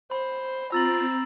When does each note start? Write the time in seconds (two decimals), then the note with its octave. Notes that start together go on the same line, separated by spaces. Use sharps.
0.11 C5 B5
0.72 C4 F4 A#5 E6 A6 F#7